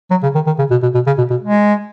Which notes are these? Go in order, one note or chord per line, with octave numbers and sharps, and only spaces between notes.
F#3
C#3
D#3
D#3
C#3
B2
B2
B2
C#3
B2
B2
G#3